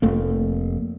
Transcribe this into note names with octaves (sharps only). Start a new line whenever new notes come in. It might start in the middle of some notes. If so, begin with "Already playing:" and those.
F1 A3 A#3